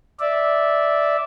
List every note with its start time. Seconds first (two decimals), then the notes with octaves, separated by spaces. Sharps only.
0.20 D5 E5